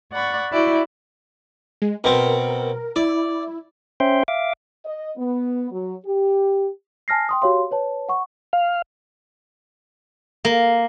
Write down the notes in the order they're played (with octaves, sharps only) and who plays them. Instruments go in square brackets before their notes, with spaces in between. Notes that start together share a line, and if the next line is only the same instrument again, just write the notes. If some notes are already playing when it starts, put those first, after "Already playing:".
[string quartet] D5 F#5 B5 C#6
E4 F#4 D5 G5
[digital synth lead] G#3
[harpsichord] B2 C4 [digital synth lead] A#4
[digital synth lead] E4 [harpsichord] D5
[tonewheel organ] C#4 C5 E5 G5 C6
E5 F5 D6
[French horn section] D#5
B3
F#3
G4
[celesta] G#5 A5 F6 A#6 C7
G5 C6 D#6
F#4 G4 C#5 F5 C6
B4 C#5 A5
F#5 C#6
[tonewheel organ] F5
[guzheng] A#3